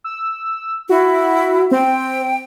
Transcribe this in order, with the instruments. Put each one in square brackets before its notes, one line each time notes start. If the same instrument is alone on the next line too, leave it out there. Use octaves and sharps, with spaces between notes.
[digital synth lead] E6
[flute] E4 [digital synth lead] F#4
[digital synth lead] C4 [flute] G5